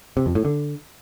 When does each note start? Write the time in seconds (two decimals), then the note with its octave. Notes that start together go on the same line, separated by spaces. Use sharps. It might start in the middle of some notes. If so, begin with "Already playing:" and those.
0.17 C3
0.26 F2
0.35 A2
0.45 D3